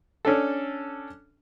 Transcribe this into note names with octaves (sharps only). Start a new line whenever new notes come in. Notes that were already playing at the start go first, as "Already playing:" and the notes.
C#4 D4 A4